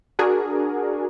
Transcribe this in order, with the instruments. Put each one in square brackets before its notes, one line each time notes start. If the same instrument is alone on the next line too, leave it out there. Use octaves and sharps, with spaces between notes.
[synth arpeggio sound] D4 F#4 G#4 A#4